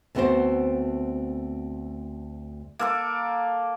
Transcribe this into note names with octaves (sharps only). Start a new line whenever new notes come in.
D2 A3 B3 C4 F#4 C5
A#3 A4 D6